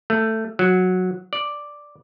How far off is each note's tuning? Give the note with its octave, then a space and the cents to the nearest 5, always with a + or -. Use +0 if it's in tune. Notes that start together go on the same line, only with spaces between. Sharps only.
A3 +10
F#3 -10
D5 +0